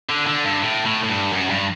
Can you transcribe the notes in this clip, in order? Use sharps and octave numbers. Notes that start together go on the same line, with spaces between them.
D3
D3
G2
A2
A2
A2
G2
F#2
G2